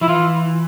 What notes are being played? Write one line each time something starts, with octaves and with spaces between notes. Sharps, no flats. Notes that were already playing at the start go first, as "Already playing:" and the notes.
F3 E4
E3 F4